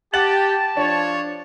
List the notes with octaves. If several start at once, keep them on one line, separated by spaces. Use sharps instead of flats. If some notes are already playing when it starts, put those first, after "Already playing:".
G4 F#5 A5 A6 F#7
F3 D4 C#5